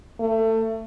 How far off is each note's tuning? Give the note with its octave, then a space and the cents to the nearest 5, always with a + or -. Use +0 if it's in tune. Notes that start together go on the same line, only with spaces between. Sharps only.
A3 +25